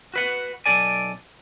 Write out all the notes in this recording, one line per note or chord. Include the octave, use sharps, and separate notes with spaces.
F#4 B4 F#5
B1 A4 D5 G#5